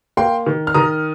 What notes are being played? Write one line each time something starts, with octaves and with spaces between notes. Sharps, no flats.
A#3 G5 C6
D#3
F6
D#3 A#5 D#6